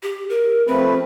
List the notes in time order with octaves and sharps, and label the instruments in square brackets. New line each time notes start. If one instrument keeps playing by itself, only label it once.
[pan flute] G4
A#4
[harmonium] F3 A3 B4 [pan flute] C4